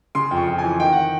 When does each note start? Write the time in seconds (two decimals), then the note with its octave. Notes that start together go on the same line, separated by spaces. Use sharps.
0.15 C#3 C6
0.31 F2
0.37 C#6
0.47 F2
0.58 E3 G#5
0.80 D#3 G5
0.92 F#5